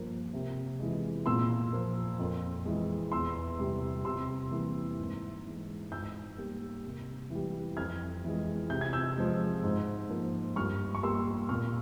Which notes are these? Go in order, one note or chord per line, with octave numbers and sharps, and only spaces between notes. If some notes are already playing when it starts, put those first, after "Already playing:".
Already playing: G2 F3 A#3
C3
E3 G#3
A#2 C6 E6
F3 A#3
F2
E3 G#3
E2 C6 E6
C3 G3
C3 C6 E6
E3 G3 A#3
G#2
E3 G#3
G#2 E6 G6
G3 A#3
C3
E3 G3
F2 F6 G#6
E3 G#3
C3 G6
G#6
E6 G6
F3 G#3
G#2
F3 A#3
G2 C#6 F6
C#6
G3 A#3 C6 E6
A#2 C#6 F6